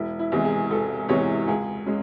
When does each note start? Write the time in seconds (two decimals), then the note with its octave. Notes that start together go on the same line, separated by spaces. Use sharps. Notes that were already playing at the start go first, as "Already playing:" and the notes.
Already playing: E1 E4
0.19 E4
0.32 E2 C3 E3 G#3
0.45 G#4
0.70 E1 A4
1.09 E2 C3 E3 G#3 C#5
1.48 C#2 G#4
1.86 G#3 C#4